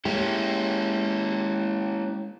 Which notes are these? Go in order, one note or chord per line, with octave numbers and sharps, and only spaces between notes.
G#3 A#3 C#4 E4 G4